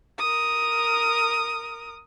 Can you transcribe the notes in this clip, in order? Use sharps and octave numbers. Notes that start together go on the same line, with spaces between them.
A#4 D#6